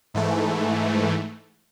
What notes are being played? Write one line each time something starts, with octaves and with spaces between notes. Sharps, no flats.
G#2 E3 A3